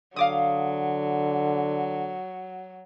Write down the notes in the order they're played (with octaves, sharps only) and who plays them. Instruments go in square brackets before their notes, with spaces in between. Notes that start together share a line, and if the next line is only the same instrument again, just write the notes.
[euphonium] D3 [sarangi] F#3 [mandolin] F5 D6 D#6